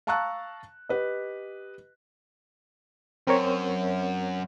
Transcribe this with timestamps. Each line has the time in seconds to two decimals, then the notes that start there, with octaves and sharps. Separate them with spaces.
0.07 F5 A5 A#5 C#6 E6 F#6
0.89 G4 B4 D#5
3.27 F#2 C4 A#4 C#5